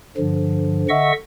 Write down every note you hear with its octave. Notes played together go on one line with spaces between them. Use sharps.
G2 D3 F3
D3 D#5 E5 F#5 C#6 E6